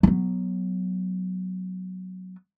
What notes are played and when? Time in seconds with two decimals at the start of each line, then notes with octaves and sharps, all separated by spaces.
0.03 F#3 B3